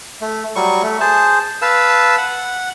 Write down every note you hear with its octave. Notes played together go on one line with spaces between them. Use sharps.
A3
F#3 G3 C#6
A3
G#4 C5 A5
B4 F5 A5 E6
F#5